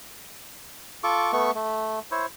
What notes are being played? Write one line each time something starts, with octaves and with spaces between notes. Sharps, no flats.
F4 A4 C#6 D6
A3 B3 C#6
A3
E4 C5 C#5